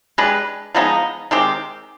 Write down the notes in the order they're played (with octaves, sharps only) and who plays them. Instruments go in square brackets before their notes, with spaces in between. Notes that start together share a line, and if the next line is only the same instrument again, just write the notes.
[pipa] G#3 D4 G4 B4
F3 G#3 B3 D#4
D#3 G#3 C4 G4